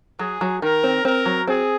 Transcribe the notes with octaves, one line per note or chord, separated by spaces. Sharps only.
F#3 G#4
F#3
D#3 A#4
C4
C4 A#4
F#3
C4 G#4